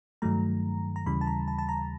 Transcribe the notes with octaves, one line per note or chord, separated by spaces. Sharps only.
G2 D#3 F#3 A3 A#5
A#5
D#2 C#3 E3 G3 B5
A5
A#5
A5
A5
A#5